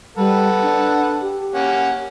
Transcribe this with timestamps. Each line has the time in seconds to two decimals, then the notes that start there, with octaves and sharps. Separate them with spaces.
0.17 G3 A4 B4 F#5
0.63 D4
1.22 G4
1.55 A#3 C#4 F#5